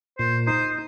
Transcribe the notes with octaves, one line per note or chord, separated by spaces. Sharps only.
A#2 C5
D#4 C5